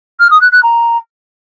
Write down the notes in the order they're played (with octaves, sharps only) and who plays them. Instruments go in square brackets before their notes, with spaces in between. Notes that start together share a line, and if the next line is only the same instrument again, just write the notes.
[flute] F6
D#6
F#6
F#6
A#5